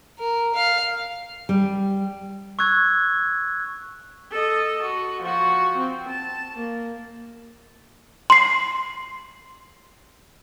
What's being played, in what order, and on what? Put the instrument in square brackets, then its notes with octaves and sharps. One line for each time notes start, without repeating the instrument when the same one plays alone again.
[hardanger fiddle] A#4
F5
[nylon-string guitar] G3
[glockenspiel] C#6 E6 F#6 G#6
[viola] A4 D#5
F#4
F3 F#4
C4
A5
A#3
[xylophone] C6 C7